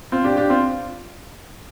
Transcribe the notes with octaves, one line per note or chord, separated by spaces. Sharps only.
C4 F4
D4 G4
D4 G4
C4 F4